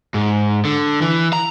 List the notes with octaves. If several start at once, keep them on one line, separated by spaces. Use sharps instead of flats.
G#2
D3
E3
A#5